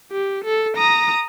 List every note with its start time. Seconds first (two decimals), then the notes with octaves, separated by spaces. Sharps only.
0.12 G4
0.45 A4
0.77 A#5 D#6